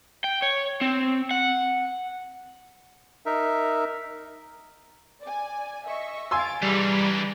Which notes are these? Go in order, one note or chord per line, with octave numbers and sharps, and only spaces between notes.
G5
C#5
C4
F#5
D#4 A#4 E5
D5 G#5
D#5 E5 C#6
F5 G#5 C6 E6 A6 D7
E3 G3 D4 G#4 A#5 B5